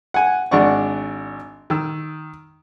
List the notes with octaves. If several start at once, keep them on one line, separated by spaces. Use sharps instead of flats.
F#5 G#5
G#1 D4 D5 F#5 C#6
D#3 E6